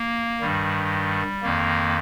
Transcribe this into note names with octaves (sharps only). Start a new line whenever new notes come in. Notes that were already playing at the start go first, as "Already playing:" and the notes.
Already playing: A#3
G2 D#3 G3
F2 D#3 A#3